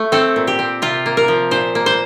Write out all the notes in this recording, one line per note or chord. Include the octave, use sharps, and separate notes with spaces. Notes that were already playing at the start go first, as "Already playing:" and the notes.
Already playing: A3
C4 A4
A#2
G4
C4
C3 F4
A#3
A#4
F3
A#2 C5
A#3
C5